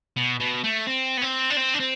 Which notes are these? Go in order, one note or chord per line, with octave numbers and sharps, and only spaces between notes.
B2
B2
A3
C4
B3
C4
D4
C4
D4
C4